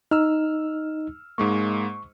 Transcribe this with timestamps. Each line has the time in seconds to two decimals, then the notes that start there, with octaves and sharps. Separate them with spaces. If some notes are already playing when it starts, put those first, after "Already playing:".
0.11 D#4 E6 F6
1.38 G#2 G#3 A#3 C#6